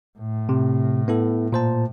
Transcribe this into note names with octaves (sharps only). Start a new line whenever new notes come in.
A2
C3
B3 E4 A4
A#2 C5 A5